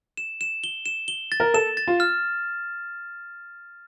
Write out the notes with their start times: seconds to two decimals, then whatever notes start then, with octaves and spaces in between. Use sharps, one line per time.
0.17 E7
0.41 E7
0.64 G7
0.86 E7
1.08 G7
1.32 A6
1.40 A#4
1.54 A4 E7
1.77 A6
1.88 F4
2.00 F6